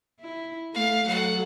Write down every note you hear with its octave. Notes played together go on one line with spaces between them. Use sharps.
E4
A3 F5
F#3 A4 F#5